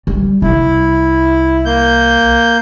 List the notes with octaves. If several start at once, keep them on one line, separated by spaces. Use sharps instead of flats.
G3
C2 E4
A#3 G6